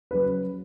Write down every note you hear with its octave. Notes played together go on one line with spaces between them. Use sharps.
C#3 F#3 B4